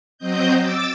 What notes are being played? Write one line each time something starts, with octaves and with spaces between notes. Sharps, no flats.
F#3 C4 D#5 G6
D6 E6 A6